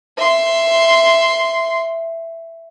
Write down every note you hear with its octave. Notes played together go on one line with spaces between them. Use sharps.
E5 C6